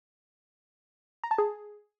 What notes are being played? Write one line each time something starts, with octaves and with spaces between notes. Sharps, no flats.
A#5
A5
G#4